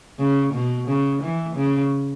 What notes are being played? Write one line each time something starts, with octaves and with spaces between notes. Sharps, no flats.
C#3
B2
C#3
E3
C#3